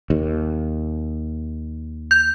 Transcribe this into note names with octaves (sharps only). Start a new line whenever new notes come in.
D#2
G6